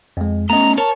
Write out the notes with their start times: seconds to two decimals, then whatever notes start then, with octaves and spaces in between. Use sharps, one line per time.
0.17 F2 G#3
0.50 A3 B3 C#4 D#5 A#5
0.78 A#4 C#5 A5